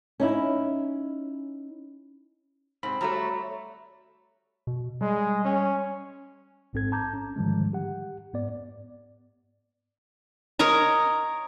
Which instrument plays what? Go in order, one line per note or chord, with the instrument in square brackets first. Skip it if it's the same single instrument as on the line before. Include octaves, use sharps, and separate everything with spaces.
[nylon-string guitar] C#4 D#4 E4
[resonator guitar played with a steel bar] G#2 C3 [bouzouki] C4 [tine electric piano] B5
[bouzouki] F#3 [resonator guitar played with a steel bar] G3 A3 [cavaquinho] D5 E5 A#5
[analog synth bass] B2
[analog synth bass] G3 [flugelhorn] G#3
[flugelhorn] C#4
[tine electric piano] A1 G#2 C4 A4 G#6
A5 A#5 D6 G6
C#4
G#2 D3 D#3 F3 G3 G#3
G4 F#5
G#2 B3 D5
[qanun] A#4 C#5 D#5 A#5